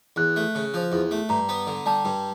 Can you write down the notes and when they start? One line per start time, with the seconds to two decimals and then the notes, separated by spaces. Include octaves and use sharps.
0.16 E2 F#6
0.36 A3
0.55 C#3
0.74 F3
0.92 E2
1.11 A3
1.29 G2 A#5
1.49 B3
1.67 D3
1.86 G3 A5
2.05 G2